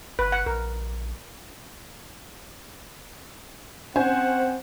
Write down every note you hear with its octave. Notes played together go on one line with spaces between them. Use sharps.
G1 B4
F#5
A#1 A#4
C4 C#4 C5 F#5 G#5